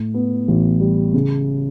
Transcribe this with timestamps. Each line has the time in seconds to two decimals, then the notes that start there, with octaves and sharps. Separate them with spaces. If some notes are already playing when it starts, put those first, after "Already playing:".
Already playing: A2
0.14 B3
0.48 A1
0.80 G3
1.14 C#3